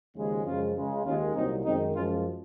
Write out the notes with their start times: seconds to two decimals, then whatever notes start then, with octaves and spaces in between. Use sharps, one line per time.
0.15 D#2 C#3 F3 G#3
0.45 F#2 C#3 F3 G#3 C#4 F4
0.75 C#2 C#3 G#3
1.05 D#2 D#3 G#3 C#4 F4
1.35 C2 A#2 F#3 C4 D#4
1.65 F#2 D#3 G#3 C4 D#4
1.94 F#2 F3 G#3 C#4 F4